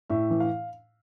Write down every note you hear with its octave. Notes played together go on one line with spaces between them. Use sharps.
A2 E5
E3
F5